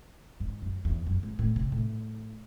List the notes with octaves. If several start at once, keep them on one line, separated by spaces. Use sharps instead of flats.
G#2
F#2
E2
F#2
G#2
A2
C3
A2